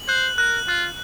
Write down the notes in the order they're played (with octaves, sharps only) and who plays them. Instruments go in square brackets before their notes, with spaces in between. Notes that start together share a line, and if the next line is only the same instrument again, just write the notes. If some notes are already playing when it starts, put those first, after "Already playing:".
Already playing: [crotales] F#7
[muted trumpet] C5 [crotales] F#6
[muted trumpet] A#4 [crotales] F#6
[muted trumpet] F4 [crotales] F#6